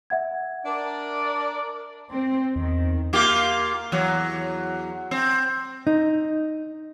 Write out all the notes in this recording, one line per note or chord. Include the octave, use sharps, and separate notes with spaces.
E5 F#5 G#6
D4 A#4 D5
C4
E2 D#3
A#3 F4 G4
E2 F#3
C4
D#4